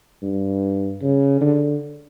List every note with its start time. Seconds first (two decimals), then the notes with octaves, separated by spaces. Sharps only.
0.22 G2
1.02 C#3
1.41 D3